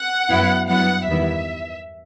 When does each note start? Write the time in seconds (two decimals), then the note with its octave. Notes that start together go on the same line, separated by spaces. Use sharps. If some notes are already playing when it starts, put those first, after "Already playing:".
Already playing: F#5
0.30 F#2 F#3 B3 E4
0.68 G2 F#3 B3 E4 F#5
1.06 E2 D#3 G3 B3 E4 E5